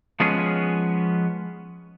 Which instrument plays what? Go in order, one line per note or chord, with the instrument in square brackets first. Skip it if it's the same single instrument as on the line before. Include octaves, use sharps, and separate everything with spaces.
[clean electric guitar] F3 G#3 B3 C#4 G#4